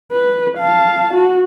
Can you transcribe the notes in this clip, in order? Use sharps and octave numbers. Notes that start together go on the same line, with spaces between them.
B4
F5 A5
F#4